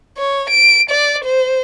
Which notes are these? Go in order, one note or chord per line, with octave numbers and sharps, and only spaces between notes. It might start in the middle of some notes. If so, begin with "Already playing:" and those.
C#5
D7
D5
C5